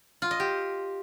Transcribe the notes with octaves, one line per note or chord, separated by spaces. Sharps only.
F4
D#5
G4